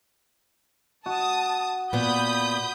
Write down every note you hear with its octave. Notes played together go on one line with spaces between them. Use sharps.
F#4 A5 D#6
A#2 B3 B5 D#6 G6